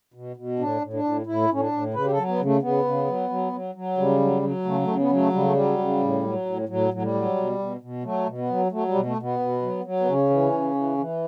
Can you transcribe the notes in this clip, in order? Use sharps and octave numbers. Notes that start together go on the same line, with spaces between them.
B2
B2
A2 D4
A2
D4
A2
A2 E4
A2 C#4
D4
A2
C#3 B4
G4
A4
F#3
B3
C#3
A3
C#3 B3
C#3
F#3
F#3
F#3
F#3
C#3 G3
F#3
F#3
C#3 A3
A3
C#3
B3
F#3
A3
C#3 G3
A3
F#3 G3
C#3
A2
F#3
A2
A2 F#3
A2 F#3
G3
F#3
B2
B2
B2
F#3 A3
B2
B3
F#3
F#3 A3
G3
B2
A3
B2
B3
B2
F#3
F#3
B3
C#3 C#4
E3
C#3
E3
E3